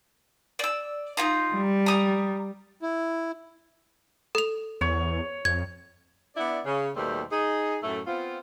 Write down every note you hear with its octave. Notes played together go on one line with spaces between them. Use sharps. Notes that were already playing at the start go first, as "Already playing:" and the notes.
D5 E6
D#4 F4 A#5
G3
A#5 D#6
E4
A4 F7
E2 C#5
F2 G#6
B3 D4 E4 D5
C#3
D#2 B2 G3 A3 C5
D#4 G#4
F#2 A2 A3
B3 C4 F4